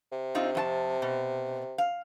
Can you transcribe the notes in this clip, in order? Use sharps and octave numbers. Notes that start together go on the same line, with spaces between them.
C3
C4 D#4 F4
F2 F4 A5
B2
F5